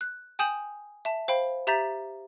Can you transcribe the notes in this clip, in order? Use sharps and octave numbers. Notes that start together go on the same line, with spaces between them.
F#6
G5 G#5 D#6 G6 E7 F#7
E5 A5
C5 F5 G5 B5
G4 E5 A#5 G6 A6 B6